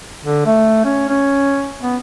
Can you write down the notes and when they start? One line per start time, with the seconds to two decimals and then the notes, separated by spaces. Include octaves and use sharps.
0.23 D3
0.46 A3
0.85 C#4
1.09 C#4
1.82 B3